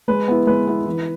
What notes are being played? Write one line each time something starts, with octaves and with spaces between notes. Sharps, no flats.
G#3 B4
B3 E4
G#3 B4
B3 E4
E3